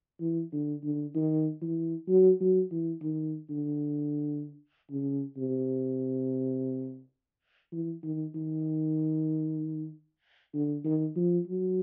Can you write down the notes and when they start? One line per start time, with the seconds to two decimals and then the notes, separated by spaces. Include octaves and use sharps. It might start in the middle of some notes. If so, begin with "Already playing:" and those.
0.21 E3
0.53 D3
0.84 D3
1.15 D#3
1.62 E3
2.09 F#3
2.41 F#3
2.72 E3
3.02 D#3
3.50 D3
4.91 C#3
5.37 C3
7.73 E3
8.03 D#3
8.35 D#3
10.54 D3
10.85 D#3
11.16 F3
11.48 F#3